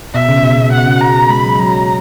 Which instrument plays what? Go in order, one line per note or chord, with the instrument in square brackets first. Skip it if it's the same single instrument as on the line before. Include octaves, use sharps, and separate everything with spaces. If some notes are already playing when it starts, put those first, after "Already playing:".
[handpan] B2 [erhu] E5
[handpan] C#3
B2
B2
[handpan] B2 [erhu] F#5
[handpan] C#3
[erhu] A#5
[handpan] G#3 [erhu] B5
[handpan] F#3
[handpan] F#3 [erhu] A#5